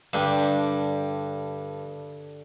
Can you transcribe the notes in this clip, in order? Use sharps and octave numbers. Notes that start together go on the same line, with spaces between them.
G2 D3 D4 G4